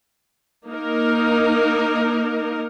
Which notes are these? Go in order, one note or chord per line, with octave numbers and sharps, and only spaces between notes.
A#3 D#4 A#4